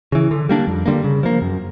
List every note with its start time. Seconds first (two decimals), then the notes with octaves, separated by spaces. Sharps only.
0.12 C#3 E3
0.31 D3
0.49 G3 A#3 D4
0.67 F2
0.86 D3 G3 A#3
1.04 C#3
1.23 F3 A#3
1.42 F#2